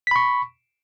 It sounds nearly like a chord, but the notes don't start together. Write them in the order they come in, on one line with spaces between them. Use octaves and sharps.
B6 B5 C#6